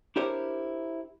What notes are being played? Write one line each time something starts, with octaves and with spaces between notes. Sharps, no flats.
D4 E4 G4 A#4 C5 C#5